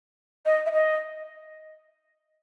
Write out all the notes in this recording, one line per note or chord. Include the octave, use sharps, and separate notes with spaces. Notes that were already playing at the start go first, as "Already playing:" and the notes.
D#5
E5
D#5